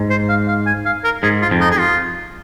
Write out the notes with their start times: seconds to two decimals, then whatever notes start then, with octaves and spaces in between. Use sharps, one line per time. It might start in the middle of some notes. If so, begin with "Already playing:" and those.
Already playing: G#2
0.10 C5
0.29 F5
0.48 F5
0.66 G#5
0.85 F5
1.04 A#4
1.23 G#2 G#4
1.42 F4
1.51 F2
1.60 D#4
1.71 G#4
1.80 F4